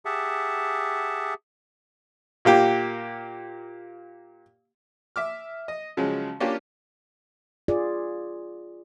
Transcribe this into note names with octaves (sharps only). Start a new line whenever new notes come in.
G4 G#4 E5 F#5 A5
A#2 A#3 G4
E5 D6 F6
D#5
C#3 F3 F#3 G#3
A#3 C#4 D4 F4 G4
F4 G#4 D5